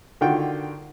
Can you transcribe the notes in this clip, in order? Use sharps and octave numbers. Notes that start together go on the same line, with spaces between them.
D3 D#3 F4 F#4 G5